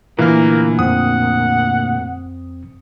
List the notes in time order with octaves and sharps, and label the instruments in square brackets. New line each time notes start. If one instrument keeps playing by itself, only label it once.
[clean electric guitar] D2 A#2 [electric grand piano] E3 F6 [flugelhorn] A#3
[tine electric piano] F2 C4 [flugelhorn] F#5 [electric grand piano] D#6